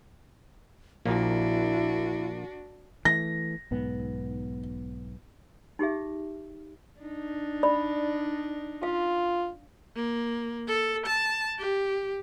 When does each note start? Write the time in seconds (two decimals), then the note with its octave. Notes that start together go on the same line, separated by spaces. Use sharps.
1.05 A#1 A#2 A#3 D4 E4 F#4
3.05 E3 A3 A#6
3.71 B1 G#2 B3
5.79 D#4 G4 G#4 E5
7.01 D4 D#4
7.63 D5 B5
8.83 F4 F5
9.95 A#3
10.68 A4
11.06 A5
11.58 G4